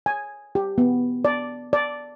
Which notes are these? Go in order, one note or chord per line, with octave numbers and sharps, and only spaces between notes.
G#5
G4
B3
D5
D5